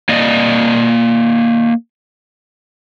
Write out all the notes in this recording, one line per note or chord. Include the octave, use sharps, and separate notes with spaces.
A#3 D5 D#5